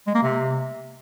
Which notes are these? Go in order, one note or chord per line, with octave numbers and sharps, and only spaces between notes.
G#3
A#3
C3